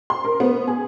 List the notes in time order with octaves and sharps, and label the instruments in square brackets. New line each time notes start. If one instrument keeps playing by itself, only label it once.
[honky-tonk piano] C6
A#4
B3
G#4